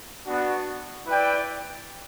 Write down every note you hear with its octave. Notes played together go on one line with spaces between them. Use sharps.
B3 D4 F#4
E4 B4 D5 G5